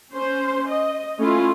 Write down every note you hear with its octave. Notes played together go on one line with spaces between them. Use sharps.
C#4 C5
D#5
A3 C#4 E4 F4